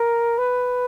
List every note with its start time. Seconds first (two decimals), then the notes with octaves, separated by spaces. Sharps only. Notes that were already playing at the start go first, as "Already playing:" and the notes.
Already playing: A#4
0.38 B4